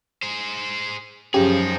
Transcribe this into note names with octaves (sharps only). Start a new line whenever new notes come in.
G#4 C5
F#2 C#3 F3 D#4 G4 G#4